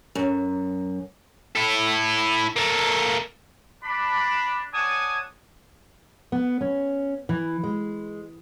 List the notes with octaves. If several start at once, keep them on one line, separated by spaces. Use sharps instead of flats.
F#2
E4 A4
A#3 A4
D4 B5
C#5 D5 F#5 G#5 A5 D#6
B3
C#4
E3
G#3